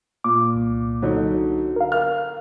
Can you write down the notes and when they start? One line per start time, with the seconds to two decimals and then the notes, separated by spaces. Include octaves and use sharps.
0.24 A#2 D6
0.55 C2
1.02 D3 F#3 D#4
1.76 A#4 F5
1.92 F6